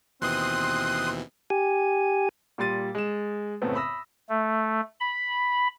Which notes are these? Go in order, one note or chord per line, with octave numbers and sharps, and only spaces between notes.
D#2 B2 E3 C4 C6 D#6 F#6
G4 G#5
A#2 G3 C6 A6 D#7
G#3 E7
F#2 A2 C#3 A3 B3 C4
B5 D#6 E6 A#6
A3
B5